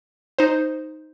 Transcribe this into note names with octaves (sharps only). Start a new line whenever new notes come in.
D#4 C5